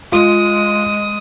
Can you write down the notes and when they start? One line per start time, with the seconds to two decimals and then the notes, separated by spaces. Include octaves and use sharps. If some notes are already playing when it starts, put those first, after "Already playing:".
0.12 G#3 F4 D#6